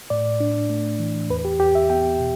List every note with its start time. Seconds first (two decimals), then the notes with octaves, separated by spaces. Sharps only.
0.10 A2 D5
0.40 D4
0.70 A3
0.99 E3
1.29 E2 B4
1.45 G4
1.60 E2 G4
1.75 E5
1.90 B3 G5
2.20 B2